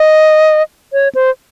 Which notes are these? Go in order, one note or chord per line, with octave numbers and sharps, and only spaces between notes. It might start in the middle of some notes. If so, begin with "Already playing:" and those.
Already playing: D#5
C#5
C5